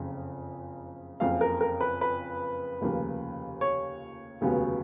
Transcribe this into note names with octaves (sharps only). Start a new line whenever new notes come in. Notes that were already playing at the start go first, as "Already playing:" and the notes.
Already playing: F#1 F2 C#3
F#1 F2 C#3 F5
A#4
A#4
B4
B4
F1 D#2 C#3 F3 A#3
C#5
F1 D#2 C#3 F#3 B3